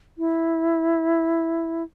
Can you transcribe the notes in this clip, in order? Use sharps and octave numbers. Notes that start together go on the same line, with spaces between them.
E4